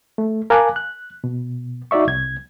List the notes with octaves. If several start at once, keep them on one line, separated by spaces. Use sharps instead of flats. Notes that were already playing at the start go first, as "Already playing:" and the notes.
A3
A#4 F5 G#5 A5 D6 F#6
F#6
B2
D#4 F#4 D5 E5 C#6
C2 G#6